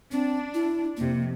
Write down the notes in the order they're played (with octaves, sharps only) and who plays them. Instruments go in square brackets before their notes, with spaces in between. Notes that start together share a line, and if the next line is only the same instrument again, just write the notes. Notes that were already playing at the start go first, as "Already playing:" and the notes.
[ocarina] C4 [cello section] D4
[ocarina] E4
[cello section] F2 C3 [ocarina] A#3